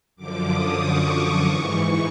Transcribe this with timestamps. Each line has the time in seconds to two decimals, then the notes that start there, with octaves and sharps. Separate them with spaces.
0.16 F#2 D3 F3 D6
0.48 D#6
0.80 C#6
1.44 G#2 E3 C#6